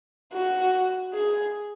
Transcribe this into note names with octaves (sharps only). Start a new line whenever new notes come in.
F#4
G#4